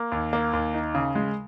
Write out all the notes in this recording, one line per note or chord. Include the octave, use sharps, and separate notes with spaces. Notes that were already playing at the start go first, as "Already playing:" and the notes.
Already playing: A#3
D#2
A#3
D#2
D#4
C#3
G#3